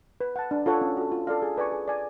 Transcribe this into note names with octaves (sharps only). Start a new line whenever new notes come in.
B4
F#5 A5
D4
F4 A4 C#5 F#5
C#4
F#4 A4
F4
A4 D5 F5
G#4
B4 D5 G#5 C#6
G#4
D5 G#5